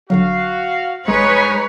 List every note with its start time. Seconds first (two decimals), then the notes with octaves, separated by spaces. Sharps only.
0.10 G1 D3 F#3 F#4 F5
1.08 G#1 G#3 D#4 B4 C#5 G#5 A#5